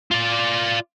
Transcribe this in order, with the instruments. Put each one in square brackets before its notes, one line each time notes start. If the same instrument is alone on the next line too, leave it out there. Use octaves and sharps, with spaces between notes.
[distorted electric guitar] F4 D5